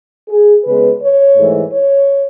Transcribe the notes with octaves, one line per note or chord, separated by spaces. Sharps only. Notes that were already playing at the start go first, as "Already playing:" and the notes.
G#4
C#3 G#3 B3 B4
C#5
G#2 E3 A3
C#5